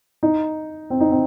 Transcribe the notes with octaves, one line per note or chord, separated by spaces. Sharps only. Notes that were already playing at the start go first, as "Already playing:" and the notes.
D#4
C4
D#4
C4